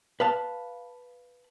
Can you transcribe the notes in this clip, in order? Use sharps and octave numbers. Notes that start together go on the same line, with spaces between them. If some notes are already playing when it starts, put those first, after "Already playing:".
B4 F5 A5